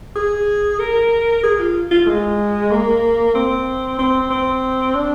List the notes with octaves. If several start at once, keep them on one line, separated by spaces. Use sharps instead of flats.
G#4
A#4
G#4
F4
F4
G#3
A#3
C4
C4
C4
D4